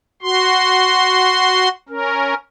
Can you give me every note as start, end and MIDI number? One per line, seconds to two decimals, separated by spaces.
0.22 1.69 66
0.22 1.69 84
1.89 2.34 61
1.89 2.34 70